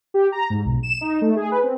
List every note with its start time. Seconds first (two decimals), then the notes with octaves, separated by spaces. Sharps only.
0.14 G4
0.32 A#5
0.50 G#2
0.65 B1
0.83 E7
1.01 D#4
1.21 A3
1.36 G#4
1.51 B4
1.63 C4